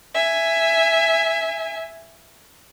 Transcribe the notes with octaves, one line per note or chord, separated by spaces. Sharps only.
E5 G#5